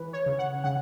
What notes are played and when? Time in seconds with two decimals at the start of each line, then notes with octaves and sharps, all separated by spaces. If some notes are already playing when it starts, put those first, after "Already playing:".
Already playing: E3 B4
0.13 C#5
0.26 C#3
0.39 F#5
0.64 C#3 F#5